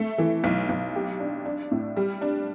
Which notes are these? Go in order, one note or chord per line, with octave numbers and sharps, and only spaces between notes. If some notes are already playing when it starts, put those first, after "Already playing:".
Already playing: A3
E3
B1
B1
G4
D4
D4
A2
G3
D4